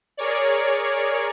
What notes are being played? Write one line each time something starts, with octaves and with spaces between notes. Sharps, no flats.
G#4 A#4 C#5 D5